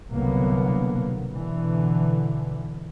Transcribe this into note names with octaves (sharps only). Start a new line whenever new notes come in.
C2 B2 D3 F#3 A#3 B3
B2 D3 E3